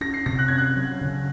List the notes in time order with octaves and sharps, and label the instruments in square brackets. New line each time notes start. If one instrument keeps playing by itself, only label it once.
[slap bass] C#4 [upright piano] A#6
[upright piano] C7
[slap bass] C3 [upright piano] A#6
[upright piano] F#6
[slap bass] C#4 [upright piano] G#6
[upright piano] F#6
[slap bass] F#3
C#3